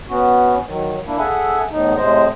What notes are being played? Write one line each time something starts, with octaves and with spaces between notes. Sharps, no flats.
B3 C#4 F#4
D#3 F#3
A#3 D4 E4
G#4 A4 E5 F#5 G#5
E2 A2 D#4
A2 C3 G#3 C5 D#5